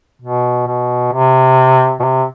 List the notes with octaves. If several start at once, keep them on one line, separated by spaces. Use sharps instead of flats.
B2
B2
C3
B2
C3